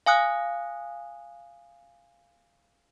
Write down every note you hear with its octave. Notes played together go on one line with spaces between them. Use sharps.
F5 G#5 D#6 F#6